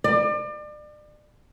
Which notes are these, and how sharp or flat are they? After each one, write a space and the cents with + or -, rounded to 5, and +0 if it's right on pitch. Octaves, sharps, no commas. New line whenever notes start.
D5 +35